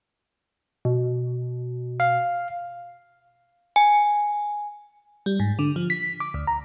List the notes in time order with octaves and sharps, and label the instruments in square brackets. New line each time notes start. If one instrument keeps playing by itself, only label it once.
[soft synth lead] B2
[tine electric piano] F5
[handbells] G#5
[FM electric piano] G3
G#2
D3
F3
B6
D6
D2
A#5